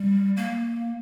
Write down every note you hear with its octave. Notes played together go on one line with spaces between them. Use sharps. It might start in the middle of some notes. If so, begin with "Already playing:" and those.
Already playing: G3
A#3